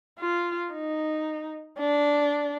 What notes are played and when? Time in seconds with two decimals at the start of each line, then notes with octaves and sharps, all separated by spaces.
0.19 F4
0.73 D#4
1.79 D4